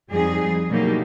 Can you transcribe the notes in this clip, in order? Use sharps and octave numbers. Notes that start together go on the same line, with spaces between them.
F2 G3 D#4 G#4
B2 D3 F#3 A#3 D#4 G4